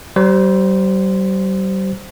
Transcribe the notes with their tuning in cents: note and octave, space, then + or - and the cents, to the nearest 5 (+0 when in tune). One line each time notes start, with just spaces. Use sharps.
G3 -40 C5 -10